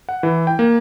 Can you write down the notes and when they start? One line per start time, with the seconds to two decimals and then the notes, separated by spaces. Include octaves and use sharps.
0.09 F#5
0.23 E3
0.47 G5
0.59 A#3